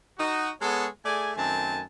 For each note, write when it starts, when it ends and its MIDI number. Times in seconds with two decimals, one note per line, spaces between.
0.19 0.50 63
0.19 0.50 66
0.61 0.87 56
0.61 0.87 59
0.61 0.87 68
0.61 0.87 69
0.61 0.87 73
1.05 1.31 57
1.05 1.31 68
1.05 1.31 74
1.05 1.31 80
1.36 1.82 42
1.36 1.82 51
1.36 1.82 57
1.36 1.82 60
1.36 1.82 80
1.36 1.82 81